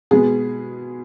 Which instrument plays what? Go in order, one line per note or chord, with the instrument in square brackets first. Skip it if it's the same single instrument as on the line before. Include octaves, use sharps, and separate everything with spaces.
[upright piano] B2 G#3 B3 G#4